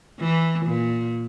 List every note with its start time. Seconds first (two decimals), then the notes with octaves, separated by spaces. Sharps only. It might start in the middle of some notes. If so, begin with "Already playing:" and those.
0.20 E3
0.66 A#2